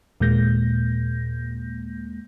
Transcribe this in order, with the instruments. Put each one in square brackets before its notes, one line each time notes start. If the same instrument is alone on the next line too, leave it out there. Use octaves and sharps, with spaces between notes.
[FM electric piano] D#2 A#2 G#3 A#3 G6 A#6